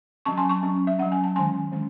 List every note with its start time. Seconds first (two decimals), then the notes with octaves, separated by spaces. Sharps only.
0.25 F#3 C#4 A5 C#6
0.37 G#5 C6
0.49 A5 C#6
0.63 F#3 C#4
0.87 E5
0.99 F#3 C#4 F#5
1.12 G#5
1.24 A5
1.35 D#3 G#3 C#4 G#5 C6
1.72 D#3 G#3 C#4